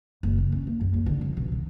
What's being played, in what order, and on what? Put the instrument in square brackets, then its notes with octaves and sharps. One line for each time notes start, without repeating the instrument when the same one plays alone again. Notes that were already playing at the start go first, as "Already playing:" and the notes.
[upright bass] F#1
C#3
C#4
A#3
F#2
A#3
D3
F3
B2
D#3